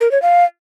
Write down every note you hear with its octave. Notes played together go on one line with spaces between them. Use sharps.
A#4
C#5
F5